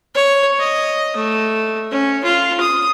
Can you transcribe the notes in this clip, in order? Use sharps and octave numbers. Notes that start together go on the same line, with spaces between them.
C#5
D#5
A3
C#4
F4
D#6